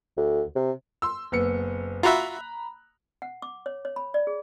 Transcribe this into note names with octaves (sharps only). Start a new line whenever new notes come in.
D2
C3
C6 E6
F#1 B3 C#7
F4 F#4 E5 A#5 B5 F#6
F#5
D6
C#5
C#5
B5
D5
G#4